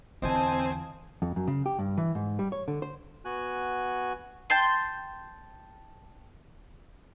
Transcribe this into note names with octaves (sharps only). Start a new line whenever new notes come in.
E2 D3 C4 C5 D#5 F5 G#5 A5
F2
F#2
C#3
G4
G2
E3
G#2
G3
C#5
D3
C5
B3 F#4 G#5 F#6
G5 A5 C6